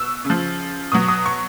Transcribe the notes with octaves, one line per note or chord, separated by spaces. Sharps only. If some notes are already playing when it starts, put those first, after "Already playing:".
Already playing: B2 E6
C#3
F3
B2 F#3 D#6
D#6
C#6